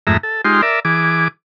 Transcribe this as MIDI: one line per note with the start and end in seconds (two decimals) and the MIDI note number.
0.07 0.17 41
0.07 0.17 44
0.07 0.17 57
0.07 0.17 76
0.07 0.17 82
0.23 0.41 69
0.45 0.62 56
0.45 0.62 63
0.45 0.62 65
0.45 0.62 67
0.45 0.62 84
0.62 0.80 70
0.62 0.80 74
0.62 0.80 76
0.85 1.28 52
0.85 1.28 68
0.85 1.28 86